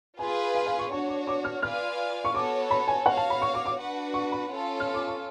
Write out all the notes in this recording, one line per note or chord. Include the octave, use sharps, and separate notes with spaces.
F4 G#4 B4 G#5
F5
F5
C#6
D4 F#4 C#5 C#6
D6
D6
F6
F4 B4 D5 F5 G#5 F6
C#6
B3 F#4 A4 C#5 D6
B5
G#5
F#4 C#5 F5 F#5
A5
B5
C#6
D6
D6
D4 F#4 B4 F#5
C#6
B5
C#4 F4 A4
F6
D6
C#6